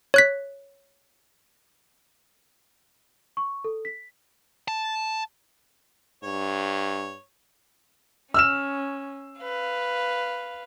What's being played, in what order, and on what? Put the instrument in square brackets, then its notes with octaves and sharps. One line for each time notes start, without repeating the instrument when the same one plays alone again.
[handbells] C#5 F#6 B6
[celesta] C#6
A4
B6
[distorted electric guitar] A5
[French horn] G2 [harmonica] C#5
[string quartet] C#4 [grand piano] E6 F6 E7
[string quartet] B4 F5